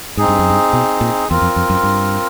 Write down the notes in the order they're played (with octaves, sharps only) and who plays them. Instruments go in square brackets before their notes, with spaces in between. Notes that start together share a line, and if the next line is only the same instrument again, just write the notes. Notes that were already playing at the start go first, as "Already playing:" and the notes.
[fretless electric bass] G#2 [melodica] C4 D#4 G#4
[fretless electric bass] G2
F#2
G2
B2
A#2
[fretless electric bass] E2 [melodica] C4 F4 A#4
[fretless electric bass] F2
F2
F#2
G2